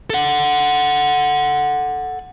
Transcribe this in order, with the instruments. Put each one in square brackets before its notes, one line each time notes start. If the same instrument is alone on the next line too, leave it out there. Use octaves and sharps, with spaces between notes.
[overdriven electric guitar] A4 F#5